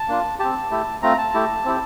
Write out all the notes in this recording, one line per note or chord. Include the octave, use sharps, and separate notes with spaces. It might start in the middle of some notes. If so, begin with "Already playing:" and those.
Already playing: A5
A#3 D4 F4
C4 G4 A5
A3 E4 G4
A3 C4 F4 A#5
A5
A3 E4 G4
C4 E4 G4